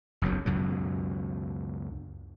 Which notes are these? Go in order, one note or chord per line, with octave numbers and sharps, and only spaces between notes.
F#1 B1 F#2 F#3
C#2 F#2 B2 F#3